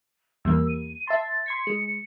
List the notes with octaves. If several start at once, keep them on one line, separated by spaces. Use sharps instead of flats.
E2 G3 A#3 E6
D#7
E5 A5 C6 A6
C6 G#6 B6 C#7
G#3